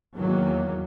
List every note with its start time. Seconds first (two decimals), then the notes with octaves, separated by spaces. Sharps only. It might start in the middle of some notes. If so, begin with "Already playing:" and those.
0.15 E2 D#3 F#3 A#3